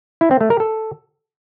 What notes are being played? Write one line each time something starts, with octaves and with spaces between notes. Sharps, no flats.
E4
C4
A3
A#4
A4